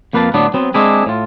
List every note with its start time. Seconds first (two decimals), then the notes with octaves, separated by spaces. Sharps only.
0.13 F2 A#3 B4 F5 A5
0.34 A2 D3 F#3 B3 D4
0.54 F#3 B3 C4
0.74 G#3 C4 D4 E4 G#4
1.06 A2 F4